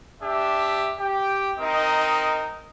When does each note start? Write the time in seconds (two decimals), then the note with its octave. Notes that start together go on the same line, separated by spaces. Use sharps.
0.23 D4 G4 E5
0.98 G4 G5
1.59 C4 D#4 A#4 D#5